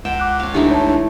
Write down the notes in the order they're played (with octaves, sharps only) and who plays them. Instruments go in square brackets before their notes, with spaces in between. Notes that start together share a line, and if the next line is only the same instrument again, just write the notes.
[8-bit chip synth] C#2 [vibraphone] F#5 [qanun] G5 [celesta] E7
[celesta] D6 F#6
[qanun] C#4 F5
[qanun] E3 A3 D#4 [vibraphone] D4 [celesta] G4
[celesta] C#5 A5